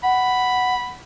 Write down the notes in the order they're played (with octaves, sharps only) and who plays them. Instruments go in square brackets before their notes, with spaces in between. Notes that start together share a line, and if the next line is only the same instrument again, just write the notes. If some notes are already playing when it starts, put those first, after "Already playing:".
[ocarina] F#5 [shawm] B5